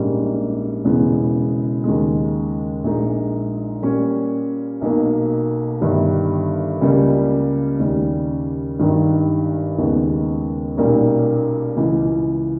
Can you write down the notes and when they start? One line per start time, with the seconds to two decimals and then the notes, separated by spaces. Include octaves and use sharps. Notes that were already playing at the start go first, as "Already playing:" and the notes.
Already playing: A#1 G#2 G3 A#3 C#4
0.85 E1 E2 C#3 G#3 B3
1.84 D#2 C#3 G#3
2.84 A#1 A#2 G#3 D#4
3.82 A#2 G3 C#4
4.81 B1 B2 A#3
5.81 G1 G2 D#3 G3
6.81 C#2 C#3 G3 A#3
7.80 D#2 C#3 G3
8.79 G#1 G2 D#3
9.78 D#2 C#3 G#3 B3
10.77 B1 A#2 G3 A#3 C#4
11.77 C#2 C#3 E3